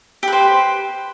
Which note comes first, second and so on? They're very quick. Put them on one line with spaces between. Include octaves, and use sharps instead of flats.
G4 B4 C5